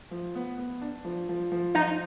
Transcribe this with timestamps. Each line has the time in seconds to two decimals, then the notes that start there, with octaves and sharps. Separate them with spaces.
0.11 F3
0.35 B3
0.58 B3
0.82 D4
1.05 F3
1.29 F3
1.52 F3
1.75 F3 D#4